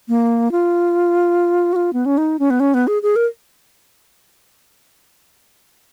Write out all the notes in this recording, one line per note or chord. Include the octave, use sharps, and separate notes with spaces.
A#3
F4
F#4
F4
B3
C#4
D#4
C#4
B3
C#4
B3
G#4
G#4
A#4